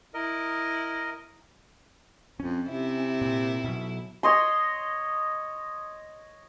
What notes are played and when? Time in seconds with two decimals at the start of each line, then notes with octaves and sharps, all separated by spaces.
0.14 E4 A#4 D#5
2.40 F2 C#4
2.69 C3 E4
3.22 A#2
3.64 B2 F#3
4.23 C#5 D#5 C6